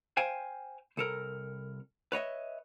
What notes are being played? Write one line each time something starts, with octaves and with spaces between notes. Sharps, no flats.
C5 F5 G5 G#5
C2 A4 A#4
B4 C#5 D#5 E5